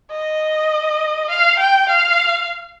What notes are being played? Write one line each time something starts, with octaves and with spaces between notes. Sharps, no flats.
D#5
F5
G5
F5